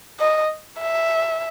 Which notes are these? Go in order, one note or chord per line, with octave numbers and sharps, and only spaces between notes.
D#5
E5